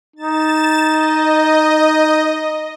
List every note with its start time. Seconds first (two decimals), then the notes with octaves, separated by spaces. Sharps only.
0.16 D#4 A6 E7
0.88 D#5